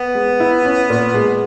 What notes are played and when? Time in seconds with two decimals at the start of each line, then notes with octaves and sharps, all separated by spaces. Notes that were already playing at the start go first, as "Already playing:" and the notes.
Already playing: B3
0.15 G#3
0.40 E4
0.65 C#4
0.90 A#2
1.14 G#3